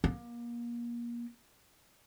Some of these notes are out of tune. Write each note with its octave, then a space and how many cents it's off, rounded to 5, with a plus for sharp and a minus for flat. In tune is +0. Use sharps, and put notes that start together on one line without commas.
A#3 +30